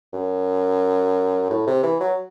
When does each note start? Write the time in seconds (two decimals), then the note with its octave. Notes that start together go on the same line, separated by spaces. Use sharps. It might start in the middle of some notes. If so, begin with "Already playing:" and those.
0.13 F#2
1.50 A2
1.67 C3
1.83 E3
2.00 F#3